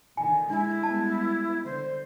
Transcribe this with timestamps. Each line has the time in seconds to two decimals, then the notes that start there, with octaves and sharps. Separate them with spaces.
0.17 A#2 D3 D#3 G#5
0.50 G#3 D4 E4
0.83 G3 G#3 B3 A5
1.65 D3 C5